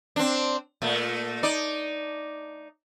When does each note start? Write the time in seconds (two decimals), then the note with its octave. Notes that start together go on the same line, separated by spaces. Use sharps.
0.16 C4 D4
0.82 A#2 A3
1.43 D#4 D5